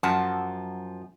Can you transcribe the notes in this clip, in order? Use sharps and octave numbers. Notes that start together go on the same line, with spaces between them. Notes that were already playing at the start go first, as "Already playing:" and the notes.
F#2 F3 F#5 A5